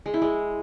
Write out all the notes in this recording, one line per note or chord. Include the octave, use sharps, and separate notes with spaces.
G#3
E4
G#3